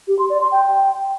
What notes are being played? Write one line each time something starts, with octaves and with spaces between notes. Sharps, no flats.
G4
C6
D5
C6
G5